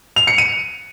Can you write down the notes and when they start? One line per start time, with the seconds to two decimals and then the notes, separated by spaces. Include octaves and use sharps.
0.16 F7
0.27 C#7
0.38 D#7